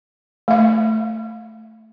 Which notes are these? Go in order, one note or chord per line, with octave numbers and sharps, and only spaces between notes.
A3 E5